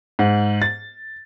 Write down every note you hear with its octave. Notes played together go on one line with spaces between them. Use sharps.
G#2
A6